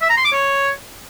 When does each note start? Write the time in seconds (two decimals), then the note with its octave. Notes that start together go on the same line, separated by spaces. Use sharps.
0.02 E5
0.09 A#5
0.17 C6
0.25 D6
0.32 C#5